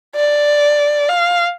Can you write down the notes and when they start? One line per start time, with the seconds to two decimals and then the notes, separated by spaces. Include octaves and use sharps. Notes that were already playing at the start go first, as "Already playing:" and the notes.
0.16 D5
1.09 F5